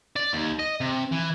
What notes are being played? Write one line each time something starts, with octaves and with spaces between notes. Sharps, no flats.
D5
D#2
D#5
C3
E3